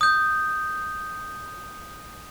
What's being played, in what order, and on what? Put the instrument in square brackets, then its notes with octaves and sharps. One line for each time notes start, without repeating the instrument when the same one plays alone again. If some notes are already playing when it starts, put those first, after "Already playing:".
[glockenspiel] D#6 G6